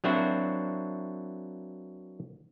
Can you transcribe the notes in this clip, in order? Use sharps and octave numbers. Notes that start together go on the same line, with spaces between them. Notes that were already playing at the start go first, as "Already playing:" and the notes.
F#3 A#3 C4 D4 E4 F#4